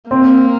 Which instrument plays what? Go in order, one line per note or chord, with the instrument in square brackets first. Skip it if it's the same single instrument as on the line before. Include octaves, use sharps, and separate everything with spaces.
[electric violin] A#3 [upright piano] C4